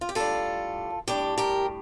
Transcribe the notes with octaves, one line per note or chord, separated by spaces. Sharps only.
F4
G4
A2 G3 D4 F4 A4
A2 G3 D4 G4
G4 A#4